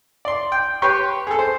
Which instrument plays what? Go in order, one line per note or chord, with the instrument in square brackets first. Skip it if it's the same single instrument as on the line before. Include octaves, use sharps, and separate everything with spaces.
[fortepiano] D5 C6
G5
G4 B4 C#5 G5 C6 C#6
G#4 A4
C5